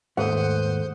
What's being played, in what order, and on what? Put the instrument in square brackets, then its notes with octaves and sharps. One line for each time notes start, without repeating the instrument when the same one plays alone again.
[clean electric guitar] D#2 G#2 [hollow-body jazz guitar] G#3 A3 [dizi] C5 [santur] F#5 D#6